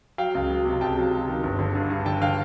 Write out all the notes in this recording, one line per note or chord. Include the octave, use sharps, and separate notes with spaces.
F#3 F5 G5
C#2
F#3
C3
C#2 G5 A5
F#3
F#3
D#3
G1
D3
G2
G2
D3 G5 A5
D3 F5 G5